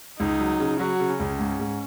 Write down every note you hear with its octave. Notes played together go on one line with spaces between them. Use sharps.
C#2 D#4
F#3
C#3
F#3 F#4
C#3
C#4
C#2
G#2
G#2